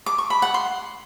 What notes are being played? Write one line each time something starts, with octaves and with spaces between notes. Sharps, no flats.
D6
C#6
B5
F#5
C6